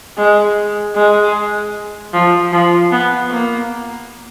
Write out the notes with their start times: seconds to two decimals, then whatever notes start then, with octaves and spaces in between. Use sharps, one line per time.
0.18 G#3
0.95 G#3
2.14 F3
2.53 F3
2.92 B3
3.31 A#3